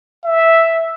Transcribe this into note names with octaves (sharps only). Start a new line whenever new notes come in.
E5